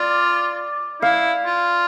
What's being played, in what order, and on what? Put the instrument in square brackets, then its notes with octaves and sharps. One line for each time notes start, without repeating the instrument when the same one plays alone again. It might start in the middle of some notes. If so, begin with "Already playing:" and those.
Already playing: [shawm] F4 [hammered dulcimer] D5
[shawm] E4 [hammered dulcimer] F5
[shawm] F4